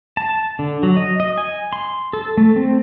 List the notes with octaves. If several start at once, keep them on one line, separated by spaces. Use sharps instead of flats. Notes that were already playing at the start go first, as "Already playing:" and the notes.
A5
D3
F#3
D#5
D#5
G#5
C6
A4
A3
C4